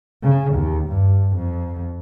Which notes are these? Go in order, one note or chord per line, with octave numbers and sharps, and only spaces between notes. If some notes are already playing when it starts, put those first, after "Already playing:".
C#3
D#2
G2
F2